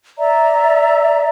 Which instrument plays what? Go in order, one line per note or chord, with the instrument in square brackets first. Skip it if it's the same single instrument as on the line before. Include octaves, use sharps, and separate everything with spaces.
[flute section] D5 E5 A#5